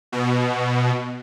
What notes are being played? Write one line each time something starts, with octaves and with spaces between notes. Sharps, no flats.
B2